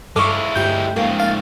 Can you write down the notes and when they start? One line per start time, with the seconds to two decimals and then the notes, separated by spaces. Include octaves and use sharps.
0.16 G2 G#3 E4 A4 F5 C#6 D6
0.55 D2 G2 G3 G6
0.96 G#2 F3 A#3 C#4 G5
1.19 F5 A6